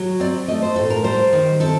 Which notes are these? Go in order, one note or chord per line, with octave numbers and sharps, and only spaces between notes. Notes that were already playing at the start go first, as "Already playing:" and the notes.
Already playing: F#3
C4 D5
A3 D#5
C5
A2 A4
A#4
G3 C5
D#3
C4 A4